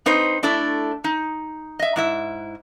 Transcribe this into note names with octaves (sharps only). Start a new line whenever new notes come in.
C4 D#4 B4 C5
A3 D4 E4 A4
D#4
D#5 E5
G#2 E4 E5